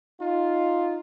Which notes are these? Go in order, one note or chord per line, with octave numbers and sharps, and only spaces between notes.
D#4 F4